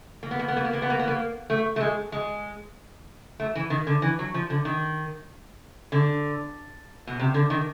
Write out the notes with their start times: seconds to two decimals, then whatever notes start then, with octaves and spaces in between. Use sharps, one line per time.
0.23 A#3
0.31 B3
0.39 A#3
0.48 B3
0.57 A#3
0.65 B3
0.73 A#3
0.82 B3
0.90 A#3
0.99 B3
1.08 A#3
1.50 A3
1.76 A3
1.81 G#3
2.12 G#3
3.40 A3
3.55 E3
3.70 D#3
3.87 D3
4.02 E3
4.19 F#3
4.34 F3
4.50 D3
4.65 D#3
5.92 D3
7.07 B2
7.20 C3
7.34 D3
7.50 D#3